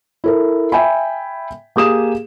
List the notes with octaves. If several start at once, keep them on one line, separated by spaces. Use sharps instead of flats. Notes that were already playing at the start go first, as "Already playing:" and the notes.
E4 A4 A#4
E5 G5 G#5 B5
A#3 G4 G#4 D#6 E7